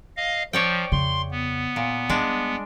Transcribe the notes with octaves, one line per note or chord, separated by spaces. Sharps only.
D#5 F5
F3 C#5 D5 G5
F2 C#3 C6
B3
A#2
G3 G#3 D4